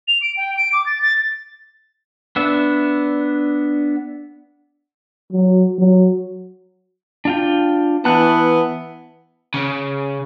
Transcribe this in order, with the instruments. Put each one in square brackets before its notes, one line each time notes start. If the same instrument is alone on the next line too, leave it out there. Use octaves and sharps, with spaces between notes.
[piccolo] F7
D7
G5
D7
D6
A6
A6
[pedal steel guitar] B3 D4 E5
[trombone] F#3
F#3
[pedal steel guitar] D4 F4 G5
[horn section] E3 B3 [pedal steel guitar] A5 F#6
[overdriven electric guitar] C#3